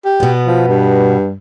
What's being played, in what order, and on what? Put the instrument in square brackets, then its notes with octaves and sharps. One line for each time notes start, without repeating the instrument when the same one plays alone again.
[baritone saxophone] G4
[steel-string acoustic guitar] B2 B3
[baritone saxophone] F3
G2